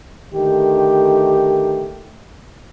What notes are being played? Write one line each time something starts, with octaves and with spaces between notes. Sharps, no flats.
D3 D#3 A3 G4